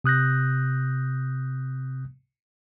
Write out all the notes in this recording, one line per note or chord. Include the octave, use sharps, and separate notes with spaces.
C3 D#6 F#6 G6 A#6